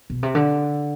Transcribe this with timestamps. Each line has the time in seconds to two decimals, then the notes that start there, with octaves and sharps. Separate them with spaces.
0.10 B2
0.23 C3
0.35 D3